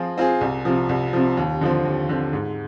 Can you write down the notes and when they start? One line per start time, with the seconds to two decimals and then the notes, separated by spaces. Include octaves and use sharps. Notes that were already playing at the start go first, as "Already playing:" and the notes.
Already playing: F3 C4 F4 G#4
0.18 C4 F4 G#4
0.41 C2
0.65 C3 F3
0.89 C2
1.13 C3 F3
1.37 D#2
1.61 D3 F3 C4
1.85 D#2
2.09 D3 F3 C4
2.33 G#2